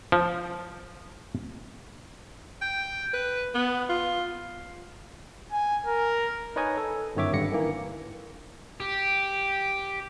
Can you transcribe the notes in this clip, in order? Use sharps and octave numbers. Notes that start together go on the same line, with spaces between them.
F3
G5
B4
B3
F4
G#5
A#4
D#4 B4 C#5 D#5 G#5 C#6
A4
G1 F#2 D#3 C#5 E5 D6
G#1 G2 D3 A#6 C#7
D#3 E3 A#3
G4